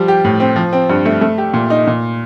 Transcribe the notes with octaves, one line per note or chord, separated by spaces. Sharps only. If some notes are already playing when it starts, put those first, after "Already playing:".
Already playing: F3 G3
G4
A2
C4
F3
C4
G2
A3
A3
G4
A#2
D#4
A#2